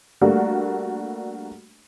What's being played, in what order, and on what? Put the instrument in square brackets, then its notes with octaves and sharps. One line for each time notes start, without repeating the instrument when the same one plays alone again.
[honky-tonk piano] G3 A3 A#3 D4 F#4